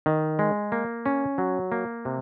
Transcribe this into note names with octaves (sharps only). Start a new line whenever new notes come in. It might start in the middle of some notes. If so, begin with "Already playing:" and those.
D#3
G#3
A#3
C#4
F#3
A#3
C3